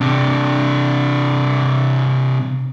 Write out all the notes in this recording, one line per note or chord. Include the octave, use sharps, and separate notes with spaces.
C3 D4